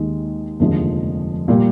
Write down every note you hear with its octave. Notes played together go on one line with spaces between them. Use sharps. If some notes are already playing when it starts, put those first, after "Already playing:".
Already playing: D#2 D#3 G#3
F1 D#2 D3 F3 G#3
A#2 G3 A#3